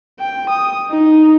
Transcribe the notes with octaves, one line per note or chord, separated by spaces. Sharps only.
G5
D#6
D#4